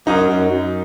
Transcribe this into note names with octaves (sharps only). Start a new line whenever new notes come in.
F#2 D#4
F#2
F#2